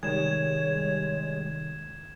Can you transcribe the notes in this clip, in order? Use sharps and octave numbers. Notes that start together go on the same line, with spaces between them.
C3 D#3 G3 G#3 C#5 G#6 E7